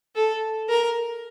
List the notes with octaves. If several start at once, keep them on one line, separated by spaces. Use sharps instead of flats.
A4
A#4